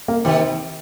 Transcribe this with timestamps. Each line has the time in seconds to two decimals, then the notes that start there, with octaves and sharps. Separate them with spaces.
0.08 A#3
0.25 C3 D#3 C4